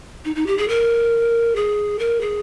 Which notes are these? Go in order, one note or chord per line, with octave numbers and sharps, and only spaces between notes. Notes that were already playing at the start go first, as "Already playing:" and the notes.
D#4
D#4
G4
G#4
A#4
G#4
A#4
G#4